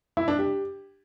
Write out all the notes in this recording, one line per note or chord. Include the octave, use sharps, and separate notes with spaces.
E4
D4
G4